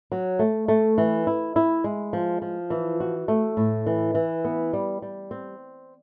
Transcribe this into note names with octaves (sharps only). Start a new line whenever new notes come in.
F#3
A3
A3
E3
E4
E4
G#3
F3
F3
E3
F#4
A3
A2
E3
E3
B3
G3
G3
C4